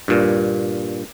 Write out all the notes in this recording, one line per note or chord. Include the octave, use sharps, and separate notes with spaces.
G2 A#2